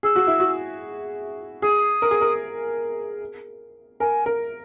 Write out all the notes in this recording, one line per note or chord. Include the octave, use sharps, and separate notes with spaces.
G#4 E6
F#4
E4
F#4
G#4 D#6
A#4
G#4
A#4
A#4 G#5
A#4